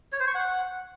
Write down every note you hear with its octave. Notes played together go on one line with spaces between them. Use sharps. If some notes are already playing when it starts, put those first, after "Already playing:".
C#5
C5
C#6
F#5